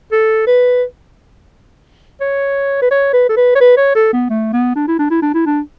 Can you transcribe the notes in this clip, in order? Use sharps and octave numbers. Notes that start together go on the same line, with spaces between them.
A4
B4
C#5
B4
C#5
B4
A4
B4
C#5
B4
C#5
A4
B3
A3
B3
D4
E4
D4
E4
D4
E4
D4